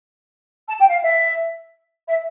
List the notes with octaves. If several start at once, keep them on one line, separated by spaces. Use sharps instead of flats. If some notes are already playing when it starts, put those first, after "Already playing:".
A5
G5
F5
E5
E5